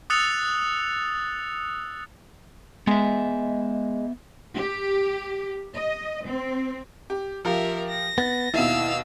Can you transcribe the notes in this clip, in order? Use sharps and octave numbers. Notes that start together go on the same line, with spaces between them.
D#6 E6 F#6 A6 C#7 F7
G#3 B3 E5
G4
D#5
C4
G4
F3 F4 G4 A#4 E5
A#6
B3 A6
D#2 B2 E4 E5 F5 E6